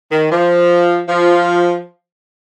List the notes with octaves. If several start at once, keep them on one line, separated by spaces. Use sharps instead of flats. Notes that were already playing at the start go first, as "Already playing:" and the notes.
D#3
F3
F3